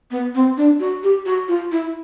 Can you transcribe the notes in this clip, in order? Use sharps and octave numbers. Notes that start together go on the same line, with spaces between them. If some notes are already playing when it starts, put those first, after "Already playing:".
B3
C4
D4
F#4
G4
F#4
F4
E4